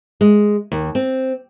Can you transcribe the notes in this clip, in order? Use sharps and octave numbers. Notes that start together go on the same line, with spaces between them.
G#3
D#2
C4